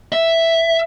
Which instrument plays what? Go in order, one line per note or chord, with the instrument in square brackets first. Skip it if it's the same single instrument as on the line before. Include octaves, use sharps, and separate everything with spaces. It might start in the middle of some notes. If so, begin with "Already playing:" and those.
[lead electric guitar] E5